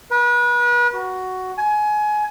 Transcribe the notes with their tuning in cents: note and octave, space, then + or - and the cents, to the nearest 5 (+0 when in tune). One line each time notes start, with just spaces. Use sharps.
B4 -35
F#4 +5
G#5 +25